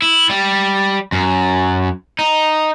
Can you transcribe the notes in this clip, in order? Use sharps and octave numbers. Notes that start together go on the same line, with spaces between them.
E4
G3
F#2
D#4